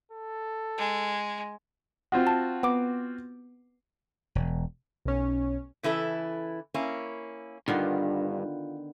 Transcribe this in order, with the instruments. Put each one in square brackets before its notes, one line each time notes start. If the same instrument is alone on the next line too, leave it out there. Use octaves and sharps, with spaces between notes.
[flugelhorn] A4
[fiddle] G#3
[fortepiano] C4 F4 F#4
[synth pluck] A5
B3 D6
[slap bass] E1
[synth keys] B1 C#4
[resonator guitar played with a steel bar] C#3 E3 E4 A4
A#3 C#4 E4
[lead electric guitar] G2 [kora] D3 D#3 B3 [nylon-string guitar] F4